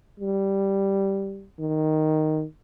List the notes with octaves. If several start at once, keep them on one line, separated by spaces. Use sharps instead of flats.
G3
D#3